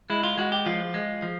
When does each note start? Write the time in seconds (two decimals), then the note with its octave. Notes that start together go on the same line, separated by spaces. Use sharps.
0.10 G#3 E4
0.23 F4
0.38 G#3 F#4
0.52 G4
0.66 F3 F4
0.94 G#3
1.22 F3